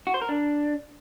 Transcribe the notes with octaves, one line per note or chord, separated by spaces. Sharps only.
F#4
C5
A#4
D4